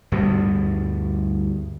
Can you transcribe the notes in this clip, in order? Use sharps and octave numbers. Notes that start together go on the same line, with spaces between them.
D2 G2 B2 G3